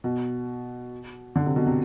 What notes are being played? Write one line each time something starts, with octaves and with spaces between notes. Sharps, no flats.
B2
D3
C3
B2
C3